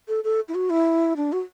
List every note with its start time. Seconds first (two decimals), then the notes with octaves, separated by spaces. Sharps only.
0.08 A4
0.24 A4
0.48 E4
0.55 F#4
0.70 E4
1.16 D4
1.33 F#4